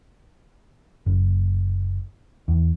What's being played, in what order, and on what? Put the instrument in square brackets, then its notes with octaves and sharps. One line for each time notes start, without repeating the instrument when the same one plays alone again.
[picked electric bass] F#1
E2